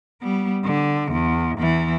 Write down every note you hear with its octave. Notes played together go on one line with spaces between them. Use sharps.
G3 B3
D3
E2
E2 E3